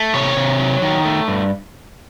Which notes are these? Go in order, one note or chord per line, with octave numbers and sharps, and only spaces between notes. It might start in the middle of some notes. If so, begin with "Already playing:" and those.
Already playing: A3
C3 C#5
C3
F#3
D#3
A3
G2